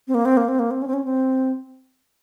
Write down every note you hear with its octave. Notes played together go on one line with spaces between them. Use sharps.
C4
A#3
C4
A#3
C4
A#3
C4
C#4
C4
C#4
C4